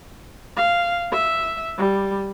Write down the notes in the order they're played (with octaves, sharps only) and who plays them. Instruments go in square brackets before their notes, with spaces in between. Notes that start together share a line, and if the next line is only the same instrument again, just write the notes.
[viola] F5
E5
G3